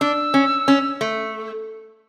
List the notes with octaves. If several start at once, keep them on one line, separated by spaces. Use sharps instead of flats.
D4 E6
C#4
C#4
A3